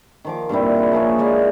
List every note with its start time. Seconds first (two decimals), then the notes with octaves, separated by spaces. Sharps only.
0.24 D#3 F3 D6
0.49 G2 A#2 C4 E4
0.76 C#3 E4
0.92 F3 A#3 G#4 C#5
1.18 G#3 E4 D5 F5